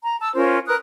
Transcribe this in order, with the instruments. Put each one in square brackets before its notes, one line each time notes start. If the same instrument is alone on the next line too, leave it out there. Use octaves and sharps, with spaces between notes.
[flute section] A#5
A5 E6
C#4 F4 A#4 C5
A#4 B4 D#6 F#6